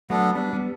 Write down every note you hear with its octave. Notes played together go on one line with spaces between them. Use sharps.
F#3 A3 B3 D4 A4
G3 B3 D4
G3 B3